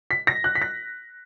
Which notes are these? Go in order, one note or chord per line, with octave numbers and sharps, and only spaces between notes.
B6
A#6
F#6
B6
A#6